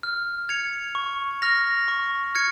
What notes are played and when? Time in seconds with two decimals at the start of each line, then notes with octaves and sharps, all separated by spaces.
0.03 F6
0.49 G#6 C#7 F7
0.95 C#6
1.42 F6 A#6 F7
1.88 C#6
2.35 F6 G#6 C#7